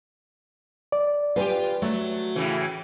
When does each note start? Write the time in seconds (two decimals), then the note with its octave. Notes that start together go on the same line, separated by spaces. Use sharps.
0.92 D5
1.36 F4 G4 B4 G#5
1.82 F#3 A3
2.36 A2 C#3 E3